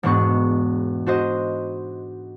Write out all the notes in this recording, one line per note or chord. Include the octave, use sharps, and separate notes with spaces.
E1 G#2 B3 D4 C#6
D4 F#4 C5 D#5